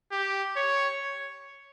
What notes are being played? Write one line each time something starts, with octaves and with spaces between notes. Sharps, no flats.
G4
C#5